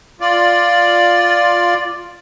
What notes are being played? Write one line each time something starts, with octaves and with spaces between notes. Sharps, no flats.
F4 D5